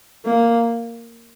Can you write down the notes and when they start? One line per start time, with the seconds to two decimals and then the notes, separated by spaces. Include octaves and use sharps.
0.25 A#3